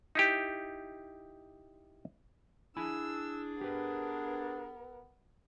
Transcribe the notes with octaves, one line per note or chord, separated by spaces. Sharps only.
D#4 E4 G4
D4 E4 G#4 G#5 B5 E6
B3 G4 A#4 B4